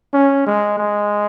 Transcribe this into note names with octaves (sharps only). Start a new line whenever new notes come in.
C#4
G#3
G#3